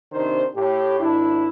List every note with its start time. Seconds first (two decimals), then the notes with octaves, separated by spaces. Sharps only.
0.12 C3 D#3 D4 D#4 C5
0.55 A2 G4
0.99 G#1 D4 E4